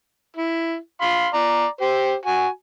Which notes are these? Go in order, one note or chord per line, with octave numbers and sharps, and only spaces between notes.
E4
F5 B5 C6
D5 A#5
G4 C5
F#4 G#5